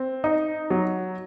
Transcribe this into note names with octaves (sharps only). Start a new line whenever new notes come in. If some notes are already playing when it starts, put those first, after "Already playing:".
Already playing: C4
D#4
F#3